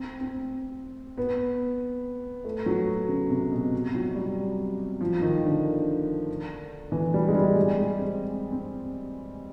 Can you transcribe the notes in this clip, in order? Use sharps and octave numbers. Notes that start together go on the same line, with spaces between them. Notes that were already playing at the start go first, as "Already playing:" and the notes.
Already playing: C4
C4
B3
A3
F#3
C#3
C3
B2
C3
F#3
G3
F3
D#3
D3
E3
G3
G#3
G3
G3
G#3
C4
C4